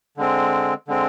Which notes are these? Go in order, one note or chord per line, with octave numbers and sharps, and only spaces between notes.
D3 G#3 C4
D3 G#3 C4